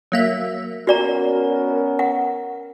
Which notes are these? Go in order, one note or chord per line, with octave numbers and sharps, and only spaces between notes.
F#3 A#3 E5
B3 C#4 F#4 A#4 D5 A#5
F#5